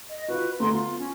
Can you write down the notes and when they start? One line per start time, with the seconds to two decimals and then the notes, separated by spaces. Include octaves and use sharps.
0.10 D#5
0.28 F4 F#4 B4
0.60 D2 A#5 C6
0.73 B3 F4
0.99 C#4